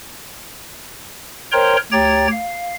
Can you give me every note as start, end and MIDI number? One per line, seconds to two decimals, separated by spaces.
1.52 1.77 70
1.52 1.77 72
1.52 1.77 73
1.52 1.77 79
1.52 1.77 82
1.52 1.77 84
1.92 2.27 38
1.92 2.27 67
1.92 2.27 73
1.92 2.27 79
1.92 2.27 82
1.92 2.27 93
2.32 2.74 77